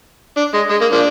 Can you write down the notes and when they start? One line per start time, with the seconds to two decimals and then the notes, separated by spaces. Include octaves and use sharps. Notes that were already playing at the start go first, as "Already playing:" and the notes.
0.37 D4
0.54 G#3
0.70 G#3
0.81 A#3
0.92 F3 A#3 D4